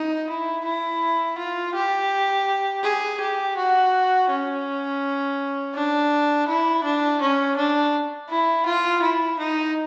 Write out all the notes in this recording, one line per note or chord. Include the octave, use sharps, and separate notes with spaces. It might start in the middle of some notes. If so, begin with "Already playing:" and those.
Already playing: D#4
E4
E4
F4
G4
G#4
G4
F#4
C#4
D4
E4
D4
C#4
D4
E4
F4
E4
D#4